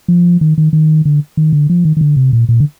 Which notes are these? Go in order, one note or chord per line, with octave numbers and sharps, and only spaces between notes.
F3
D#3
D#3
D#3
D3
D#3
D3
F3
D#3
D#3
D3
C3
A#2
A#2
D3